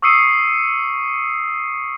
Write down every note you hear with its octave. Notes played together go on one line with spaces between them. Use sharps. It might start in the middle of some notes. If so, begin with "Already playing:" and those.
C#6 D#6 E6 C7 C#7 D#7